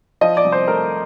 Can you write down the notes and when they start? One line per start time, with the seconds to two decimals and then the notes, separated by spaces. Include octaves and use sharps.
0.21 F3 D#5
0.37 D5
0.44 C2
0.52 C5
0.68 A3 A#4